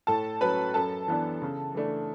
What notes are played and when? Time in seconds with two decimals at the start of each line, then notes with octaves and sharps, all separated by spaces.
0.07 A2 A4 A5
0.41 F#3 C#4 B4 B5
0.74 F#2 A4 A5
1.08 E3 B3 D4
1.42 C#3
1.75 E3 A3 D4